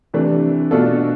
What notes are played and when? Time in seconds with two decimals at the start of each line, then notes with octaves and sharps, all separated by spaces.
0.14 C3 E3 A3 D4
0.71 B2 A3 D4 F4 A4